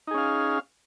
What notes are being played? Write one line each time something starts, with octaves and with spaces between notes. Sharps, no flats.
C#4 D#4 G#4 F5